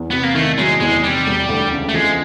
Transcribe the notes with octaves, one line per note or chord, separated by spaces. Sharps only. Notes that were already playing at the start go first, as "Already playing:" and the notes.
Already playing: E2
C3 B3
A#3
D#3 A3
F#3 G#3
E2 G#3
C3 G3
E1
D2
C#3
A3
F3 G#3